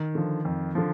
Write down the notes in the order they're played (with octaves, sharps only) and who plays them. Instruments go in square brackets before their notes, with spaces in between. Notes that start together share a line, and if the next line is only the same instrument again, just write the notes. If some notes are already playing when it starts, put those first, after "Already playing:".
Already playing: [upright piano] D#3
[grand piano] D3 F3
F2
D3 F3